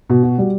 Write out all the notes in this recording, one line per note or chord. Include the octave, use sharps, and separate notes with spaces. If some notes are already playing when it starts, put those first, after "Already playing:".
B2
F#4
G3